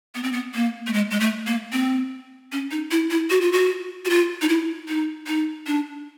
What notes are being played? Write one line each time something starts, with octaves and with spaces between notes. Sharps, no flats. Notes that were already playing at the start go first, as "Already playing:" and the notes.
B3
C4
B3
A#3
A3
G#3
G#3
A3
A#3
C4
C#4
D#4
E4
E4
F#4
F4
F#4
F#4
F4
D#4
E4
D#4
D#4
D4